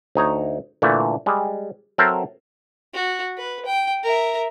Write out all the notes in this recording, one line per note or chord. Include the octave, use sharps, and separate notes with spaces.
D2 D#4 C#5 A#5
A#2 D3 E3 A3
G3 G#3
F#3 C4 A4 A#4 C5 E5
F#4
B4
G5
A#4 E5